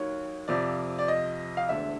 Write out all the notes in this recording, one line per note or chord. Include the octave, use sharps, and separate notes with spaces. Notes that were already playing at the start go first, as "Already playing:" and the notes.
Already playing: D#2 D#3 F#3 C#5
F2 C3 F3 D5
D5
D#5
F5
E1 D2 D3 E5